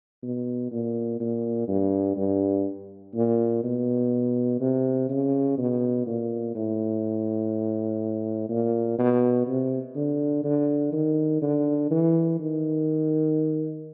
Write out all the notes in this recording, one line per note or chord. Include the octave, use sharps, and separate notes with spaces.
B2
A#2
A#2
G2
G2
A#2
B2
C3
C#3
B2
A#2
A2
A#2
B2
C3
D3
D3
D#3
D3
E3
D#3